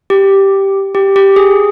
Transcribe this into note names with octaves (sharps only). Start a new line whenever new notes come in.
G4
G4
G4
G#4